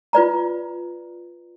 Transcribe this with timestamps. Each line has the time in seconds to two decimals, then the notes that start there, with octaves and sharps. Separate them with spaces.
0.13 F4 B4 D5 A#5